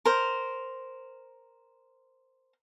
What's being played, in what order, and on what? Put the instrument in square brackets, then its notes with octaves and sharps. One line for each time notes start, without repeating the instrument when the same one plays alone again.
[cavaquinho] A#4 C5